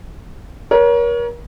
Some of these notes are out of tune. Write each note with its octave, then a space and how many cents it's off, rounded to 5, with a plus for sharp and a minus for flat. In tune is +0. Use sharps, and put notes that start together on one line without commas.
A#4 +35 C#5 +20